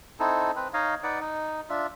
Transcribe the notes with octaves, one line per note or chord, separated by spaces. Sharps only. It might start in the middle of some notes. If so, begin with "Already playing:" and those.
C4 D#4 E4 A4
C4 B4
D#4 C#5 D#5 F5
D#4 B4 D5 F#5
D#4
D4 F4 E5